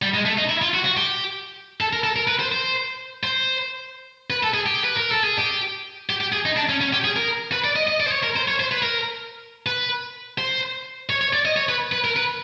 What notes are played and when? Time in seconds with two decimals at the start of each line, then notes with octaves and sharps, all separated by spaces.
0.02 G3
0.14 G#3
0.26 A3
0.38 D#4
0.49 E4
0.62 F4
0.74 F#4
0.85 F#4
0.97 G4
1.81 A4
1.93 A#4
2.04 A4
2.16 A#4
2.28 B4
2.40 C5
2.52 C5
3.24 C5
4.30 B4
4.43 A4
4.54 G#4
4.66 G4
4.84 B4
4.97 A#4
5.11 A4
5.24 G#4
5.38 G4
6.10 G4
6.21 G4
6.33 G#4
6.46 D#4
6.57 D4
6.69 C#4
6.81 C#4
6.93 G4
7.05 G#4
7.16 A#4
7.52 B4
7.64 D5
7.76 D#5
7.88 D#5
8.00 D5
8.07 C5
8.12 C#5
8.23 A#4
8.36 C5
8.48 C#5
8.60 C5
8.72 B4
8.83 A#4
9.67 B4
10.38 C5
11.10 C#5
11.21 C#5
11.33 D5
11.46 D#5
11.57 C#5
11.69 B4
11.92 B4
12.04 A#4
12.16 B4